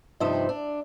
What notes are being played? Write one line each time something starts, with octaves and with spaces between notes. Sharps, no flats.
G2 C3 F3 D#4 C5 E5
D4